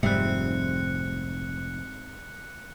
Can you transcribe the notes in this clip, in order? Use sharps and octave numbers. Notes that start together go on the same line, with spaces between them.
F1 G#2 G3 C4 E5 F#6 C#7